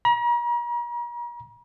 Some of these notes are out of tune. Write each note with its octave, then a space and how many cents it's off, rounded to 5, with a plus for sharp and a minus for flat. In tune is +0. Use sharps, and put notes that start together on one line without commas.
A#5 +40